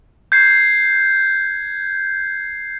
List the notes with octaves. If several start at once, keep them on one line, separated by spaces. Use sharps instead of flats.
G6 G#6 C7